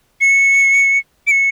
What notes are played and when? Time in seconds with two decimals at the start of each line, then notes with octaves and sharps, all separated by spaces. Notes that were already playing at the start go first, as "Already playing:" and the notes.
0.21 C#7
1.27 D7
1.31 C#7